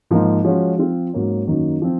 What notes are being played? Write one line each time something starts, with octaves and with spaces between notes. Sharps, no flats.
G#2 F3 A#3 D#4
F3 G#3 C#4 F#4
F3 C4 F4
G#2 F#3 A#3 C#4
F#2 D#3 F#3 A#3 D#4
F3 C4